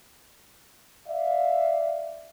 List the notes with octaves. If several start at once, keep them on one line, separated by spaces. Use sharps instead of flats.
D5 E5 F5